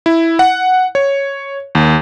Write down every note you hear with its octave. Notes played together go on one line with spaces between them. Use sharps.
E4
F#5
C#5
D#2